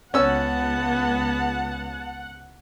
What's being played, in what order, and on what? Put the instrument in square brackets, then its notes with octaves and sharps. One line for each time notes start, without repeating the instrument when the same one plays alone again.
[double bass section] C#2 [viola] B3 A5 [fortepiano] C#4 E6 [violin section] F#5